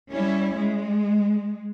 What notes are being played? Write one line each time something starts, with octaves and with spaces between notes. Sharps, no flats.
G3 C#4 E4
G#3